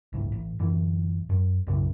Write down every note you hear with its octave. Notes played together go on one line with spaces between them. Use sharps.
G1 C#2 A2
A1
D1 F#2 E3
F#2
B1 F#2 A2 C#3